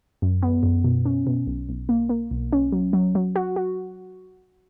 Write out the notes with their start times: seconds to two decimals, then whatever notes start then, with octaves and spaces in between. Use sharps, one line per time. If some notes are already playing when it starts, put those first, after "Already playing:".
0.22 F#2
0.43 B3
0.63 F#2
0.84 B2
1.05 C#4
1.27 B2
1.47 B1
1.69 B1
1.89 A#3
2.09 A#3
2.31 B1
2.53 C#4
2.72 F#3
2.93 F#3
3.15 F#3
3.36 F#4
3.56 F#4